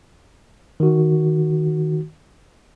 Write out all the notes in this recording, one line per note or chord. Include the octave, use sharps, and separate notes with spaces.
D#3 F#4